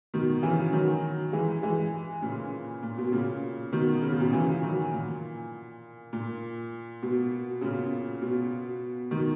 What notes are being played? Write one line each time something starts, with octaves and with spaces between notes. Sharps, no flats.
B2 D#3
C#3 E3
D#3 F#3
E3 G#3
E3 G#3
A#2 C#3
A#2
B2
A#2 C#3
B2 D#3
C#3
B2
A#2 C#3
C#3 E3
D#3 F#3
A#2
A#2
B2
A#2 C#3
B2
B2 D#3